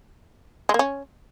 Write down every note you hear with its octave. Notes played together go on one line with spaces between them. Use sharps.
G#3
A#3
C#4